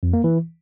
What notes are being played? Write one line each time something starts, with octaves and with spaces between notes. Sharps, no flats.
F2
A#3
E3